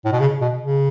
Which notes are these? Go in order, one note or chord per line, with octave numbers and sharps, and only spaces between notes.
A2
B2
C#3
B2
C#3